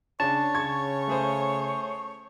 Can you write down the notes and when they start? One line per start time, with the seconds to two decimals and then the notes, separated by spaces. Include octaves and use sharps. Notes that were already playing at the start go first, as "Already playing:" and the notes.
0.20 C#3 D4 C#5 A5
0.55 C#3 C#6 G#6
1.08 A3 G#4 C5